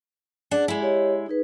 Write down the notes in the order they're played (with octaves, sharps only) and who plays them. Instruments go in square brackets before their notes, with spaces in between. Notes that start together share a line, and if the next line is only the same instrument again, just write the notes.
[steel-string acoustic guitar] D4 F#5 [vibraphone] G#4
[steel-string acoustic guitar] G#3 E4
[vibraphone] G4 C#5 D#5
D#4 G#4 B4